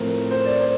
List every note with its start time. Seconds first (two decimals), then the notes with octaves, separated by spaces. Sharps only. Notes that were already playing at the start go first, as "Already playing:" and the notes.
Already playing: A2 F3 A3 C4 A#4
0.31 C5
0.45 D5
0.59 C5